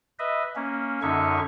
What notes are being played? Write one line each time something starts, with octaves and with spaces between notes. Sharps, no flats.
B4 D#5 E5
A#3 C#4
F#2 D3 C#4 D#4 E5 C#6